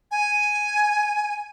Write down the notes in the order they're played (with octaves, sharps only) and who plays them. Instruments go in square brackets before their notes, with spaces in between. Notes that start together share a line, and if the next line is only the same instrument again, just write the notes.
[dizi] G#5